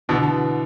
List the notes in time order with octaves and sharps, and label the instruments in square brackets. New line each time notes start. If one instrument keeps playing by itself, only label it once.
[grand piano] B2 D3 [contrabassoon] E3